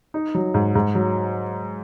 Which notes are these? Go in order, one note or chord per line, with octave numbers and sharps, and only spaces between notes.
D#4
F#3
G#2
G#2
F#3